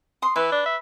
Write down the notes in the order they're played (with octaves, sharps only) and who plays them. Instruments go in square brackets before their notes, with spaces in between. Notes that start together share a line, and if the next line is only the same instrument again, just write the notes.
[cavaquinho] C6 D#6
[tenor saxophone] E3 [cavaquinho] B4
[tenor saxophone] D4
E5